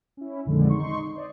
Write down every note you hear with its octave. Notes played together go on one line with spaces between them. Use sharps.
C#4 E4
A#1 F2 D3 D#3 G#3
D#4 C6 C#6
C5 D5 D#5